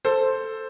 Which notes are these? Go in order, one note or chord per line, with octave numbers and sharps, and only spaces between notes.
A4 C5